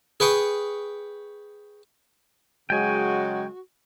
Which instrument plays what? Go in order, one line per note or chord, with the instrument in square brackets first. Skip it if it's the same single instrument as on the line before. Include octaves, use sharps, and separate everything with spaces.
[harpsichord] G#4 B4 G5 C#6 D#6
[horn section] C#3 F#3 G#3 [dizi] F#4 [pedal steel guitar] G5 G#5